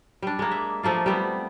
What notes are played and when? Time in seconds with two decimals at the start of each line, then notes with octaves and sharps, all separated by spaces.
0.22 G3 D4
0.39 G#3 A#3
0.51 E5
0.83 F3 A3 A#3 F4
1.06 G3 B3 C4